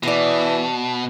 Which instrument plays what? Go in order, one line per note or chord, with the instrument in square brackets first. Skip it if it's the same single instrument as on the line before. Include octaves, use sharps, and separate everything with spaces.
[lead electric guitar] B2 [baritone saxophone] E3 [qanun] D5 A#5